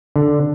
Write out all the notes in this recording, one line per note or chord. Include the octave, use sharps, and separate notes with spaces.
D3